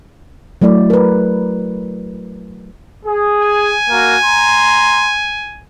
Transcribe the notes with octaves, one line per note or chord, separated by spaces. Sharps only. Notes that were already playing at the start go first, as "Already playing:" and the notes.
F#3 A3 E4 D5
A#4 B4
G#4
G#5
A#3 F#4 A#4
A#5 C6